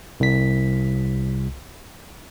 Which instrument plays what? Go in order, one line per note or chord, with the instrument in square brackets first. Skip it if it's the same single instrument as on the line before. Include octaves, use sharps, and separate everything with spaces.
[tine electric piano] C2 B6